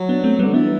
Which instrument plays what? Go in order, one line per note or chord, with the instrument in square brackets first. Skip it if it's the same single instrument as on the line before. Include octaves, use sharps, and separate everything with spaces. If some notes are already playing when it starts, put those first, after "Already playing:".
Already playing: [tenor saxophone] F#3
[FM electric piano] B3 D4
A3 C4
[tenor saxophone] D3 [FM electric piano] G3 B3
[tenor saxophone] E3 [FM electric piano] B3 D4